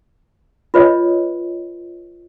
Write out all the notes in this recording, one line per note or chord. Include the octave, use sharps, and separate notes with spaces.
F4 B4 C#5 D#5